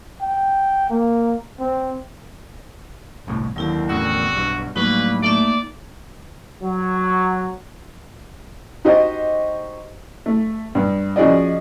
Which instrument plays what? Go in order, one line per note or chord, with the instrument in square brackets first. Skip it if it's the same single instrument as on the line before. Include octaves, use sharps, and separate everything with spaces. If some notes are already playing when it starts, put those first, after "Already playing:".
[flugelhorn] G5
A#3
C4
[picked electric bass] G1 C2 A2
[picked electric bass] D#2 [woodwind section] D3 D#3 C4 [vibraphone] F#3 E4 G4
[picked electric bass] E2 A2 C#3 [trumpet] F#4 [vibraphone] E6
[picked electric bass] B1 G2
[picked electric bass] A2 F#3 [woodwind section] G3 A#3 [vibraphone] D#4 [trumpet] B4
[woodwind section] A3 [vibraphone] A#3 D#4 E5 [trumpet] D5
[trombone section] F#3
[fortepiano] D#4 F#4 G4 C5 D#5
A3
G2
F3 C#4 F#4 G#4 D5 D#5